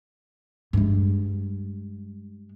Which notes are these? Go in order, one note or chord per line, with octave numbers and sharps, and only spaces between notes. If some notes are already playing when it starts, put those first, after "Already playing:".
G2 G#3